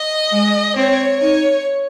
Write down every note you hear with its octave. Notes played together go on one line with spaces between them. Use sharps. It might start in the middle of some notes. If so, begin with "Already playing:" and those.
Already playing: D#5
G#3
C4 C#5
D#4 C#5